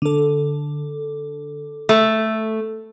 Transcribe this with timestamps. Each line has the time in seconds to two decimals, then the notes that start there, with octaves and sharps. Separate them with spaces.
0.02 D3 A4
1.89 A3